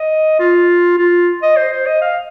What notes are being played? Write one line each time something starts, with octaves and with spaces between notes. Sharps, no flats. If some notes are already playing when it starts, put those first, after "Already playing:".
Already playing: D#5
F4
F4
D#5
C5
C5
D#5
F5